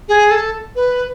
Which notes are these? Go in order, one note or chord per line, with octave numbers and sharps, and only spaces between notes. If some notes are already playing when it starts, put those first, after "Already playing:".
G#4
A4
B4